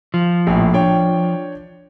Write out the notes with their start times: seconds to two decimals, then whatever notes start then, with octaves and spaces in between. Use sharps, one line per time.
0.14 F3
0.47 A#1 A2
0.73 D4 C#5 G5